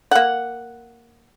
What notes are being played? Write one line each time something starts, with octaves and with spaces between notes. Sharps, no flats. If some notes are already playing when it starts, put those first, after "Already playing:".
A#3 F#5